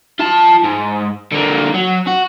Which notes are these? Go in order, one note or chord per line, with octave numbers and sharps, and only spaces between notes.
F4 A5
G#2
D3 A#3
F#3
F#4